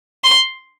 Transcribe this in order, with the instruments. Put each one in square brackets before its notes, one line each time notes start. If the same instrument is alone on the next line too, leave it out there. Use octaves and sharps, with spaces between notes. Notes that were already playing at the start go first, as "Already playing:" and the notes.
[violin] C6